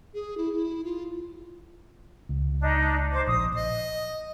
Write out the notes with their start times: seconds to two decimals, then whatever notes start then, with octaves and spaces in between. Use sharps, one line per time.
0.14 G#4
0.38 E4
0.53 E4
0.84 F4
2.29 C#2
2.61 D4 D#4
3.12 C5 D6
3.27 A#1 D#6
3.55 D#5